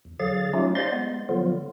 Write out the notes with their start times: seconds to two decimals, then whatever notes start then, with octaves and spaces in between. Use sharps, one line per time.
0.05 E2
0.20 D3 F#3 G#4 F5 A6
0.53 F#3 A3 C#4 D#4 F4 G4
0.75 C5 D5 D#5 F5 C6 A6
0.92 G#3 B3
1.29 D3 F3 F#3 B3 F4